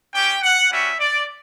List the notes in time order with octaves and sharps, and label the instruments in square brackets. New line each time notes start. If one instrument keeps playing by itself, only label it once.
[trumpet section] C#4 G4 G5
F#5
G3 C#4 F#4 E5
D5